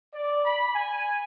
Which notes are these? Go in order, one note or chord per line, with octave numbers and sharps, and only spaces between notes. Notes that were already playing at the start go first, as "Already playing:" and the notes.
D5
B5
G#5